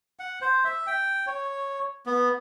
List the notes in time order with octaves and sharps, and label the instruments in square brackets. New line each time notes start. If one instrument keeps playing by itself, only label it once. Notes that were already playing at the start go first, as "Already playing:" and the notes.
[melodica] F#5
C5
E5
G5
C#5
B3